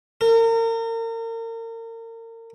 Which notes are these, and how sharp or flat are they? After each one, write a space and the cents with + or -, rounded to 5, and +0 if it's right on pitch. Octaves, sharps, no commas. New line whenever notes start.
A#4 -35